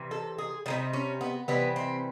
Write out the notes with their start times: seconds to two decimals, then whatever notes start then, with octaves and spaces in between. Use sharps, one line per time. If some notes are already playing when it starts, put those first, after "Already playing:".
Already playing: C3 E3 G3
0.11 A4
0.38 G#4
0.66 C3 E3 G3 D#4
0.93 C#4
1.21 B3
1.48 C3 E3 G3 B3
1.76 C4